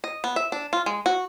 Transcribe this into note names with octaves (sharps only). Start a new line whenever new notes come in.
D#5
B3
E5
D4
F4
G#3
F#4